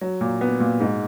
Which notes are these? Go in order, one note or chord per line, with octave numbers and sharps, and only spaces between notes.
F#3
A#2
B3
A#2
G#2